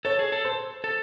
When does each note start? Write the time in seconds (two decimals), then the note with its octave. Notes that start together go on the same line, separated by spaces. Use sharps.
0.05 A4 C#5
0.19 G#4
0.32 A4
0.45 C5
0.84 A4